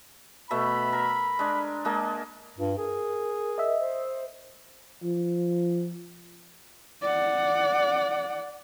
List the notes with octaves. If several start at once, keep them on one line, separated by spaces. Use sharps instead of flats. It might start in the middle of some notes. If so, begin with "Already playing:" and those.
B2 A3 E5 B5
A#4
G#3 D4
G#3 A#3 A5
G2 F4
G#4 A#4
D#5 E5
C5
F3
D5 F#5